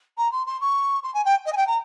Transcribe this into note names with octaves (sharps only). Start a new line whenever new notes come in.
A#5
C6
C6
C#6
C6
G#5
G5
D#5
G#5
G5
A#5